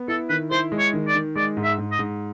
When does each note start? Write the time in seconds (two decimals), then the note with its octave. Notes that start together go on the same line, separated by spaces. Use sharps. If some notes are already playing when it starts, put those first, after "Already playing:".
Already playing: B3
0.08 E4 A4
0.29 D#3 B4
0.51 E4 C5
0.72 G#3
0.79 C#5
0.93 D#3
1.08 D5
1.15 D#3
1.36 G#3 D5
1.57 G#2
1.63 E5
1.78 G#2
1.91 D#5
1.99 G#2